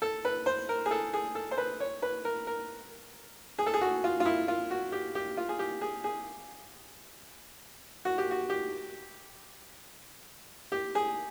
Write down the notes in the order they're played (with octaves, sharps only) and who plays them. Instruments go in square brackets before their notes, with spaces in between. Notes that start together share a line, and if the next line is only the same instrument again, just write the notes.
[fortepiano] A4
B4
C5
A#4
G#4
A4
G#4
A4
C5
B4
C#5
B4
A#4
A#4
G#4
A4
G#4
F#4
F4
F4
E4
F4
F#4
G4
G4
F4
G#4
G4
G#4
G#4
F#4
G4
F#4
G4
G4
G#4